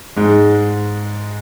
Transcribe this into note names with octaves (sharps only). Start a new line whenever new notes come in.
G#2 G#3